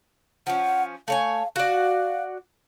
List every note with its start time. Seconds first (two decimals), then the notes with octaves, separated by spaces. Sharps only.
0.47 F3 C#4 F#5
1.08 A3 C#5 F5 G#5
1.56 F#4 D5 F5